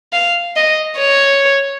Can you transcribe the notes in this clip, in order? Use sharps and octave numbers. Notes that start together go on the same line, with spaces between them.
F5
D#5
C#5